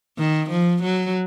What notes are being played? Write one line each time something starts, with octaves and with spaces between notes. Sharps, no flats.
D#3
F3
F#3